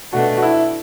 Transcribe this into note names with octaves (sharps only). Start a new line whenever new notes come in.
B2 A3 D4 F#4
F#4
E4